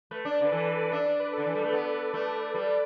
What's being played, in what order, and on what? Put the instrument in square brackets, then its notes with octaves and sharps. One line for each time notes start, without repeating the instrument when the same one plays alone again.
[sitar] A3 [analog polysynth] B4
[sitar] D4
[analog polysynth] D5
[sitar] D3 [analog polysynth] B4
[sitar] E3 [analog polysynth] A4
[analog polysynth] B4
D5
[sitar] D4 [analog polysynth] E5
[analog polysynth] D5
B4
[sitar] D3 [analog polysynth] A4
[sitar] E3
G3
A3
B3
A3
G3